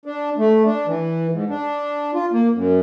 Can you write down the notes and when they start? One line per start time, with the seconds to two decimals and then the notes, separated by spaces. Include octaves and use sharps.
0.06 D4
0.38 A3
0.65 D4
0.87 E3
1.31 G#2
1.50 D4
2.14 F4
2.33 A#3
2.55 F#2